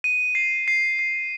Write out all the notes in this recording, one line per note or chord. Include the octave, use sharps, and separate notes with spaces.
D#7
C7
C7
C7